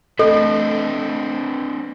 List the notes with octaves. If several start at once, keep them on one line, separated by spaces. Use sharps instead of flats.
A3 C4 D4 A4 B4 D#5